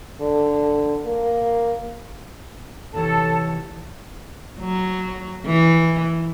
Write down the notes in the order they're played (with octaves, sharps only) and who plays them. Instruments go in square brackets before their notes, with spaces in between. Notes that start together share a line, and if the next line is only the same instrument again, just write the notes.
[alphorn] D3
A#3
[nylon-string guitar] C3 E3 [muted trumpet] A4 [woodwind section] C#5 A5
[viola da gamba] F#3
E3